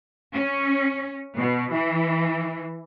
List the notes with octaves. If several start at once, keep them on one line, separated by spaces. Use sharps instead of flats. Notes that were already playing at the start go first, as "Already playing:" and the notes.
C#4
B2
E3